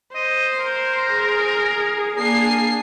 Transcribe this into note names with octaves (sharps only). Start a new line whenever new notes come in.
C5 D#5
A#4
G#4
A#3 D4 G#5 C7